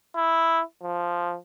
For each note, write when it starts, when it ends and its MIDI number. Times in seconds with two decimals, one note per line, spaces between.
0.16 0.62 64
0.83 1.37 53